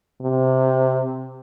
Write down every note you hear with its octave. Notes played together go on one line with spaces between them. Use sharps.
C3